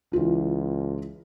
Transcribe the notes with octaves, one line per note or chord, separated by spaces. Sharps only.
C#2 E3 F4